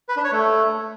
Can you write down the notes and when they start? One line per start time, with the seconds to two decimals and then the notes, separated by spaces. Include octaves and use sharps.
0.09 B4
0.17 D4
0.24 C#5
0.32 A3